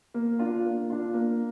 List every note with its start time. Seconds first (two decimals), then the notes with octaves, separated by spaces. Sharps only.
0.14 A#3
0.39 D4 F4
0.65 A#3
0.90 D4 F4
1.14 A#3